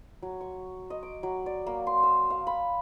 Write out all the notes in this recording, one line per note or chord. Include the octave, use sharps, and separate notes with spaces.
F#3
C#6
D#5
D6
F#3
D5
A#3
C6
E6
F5
B5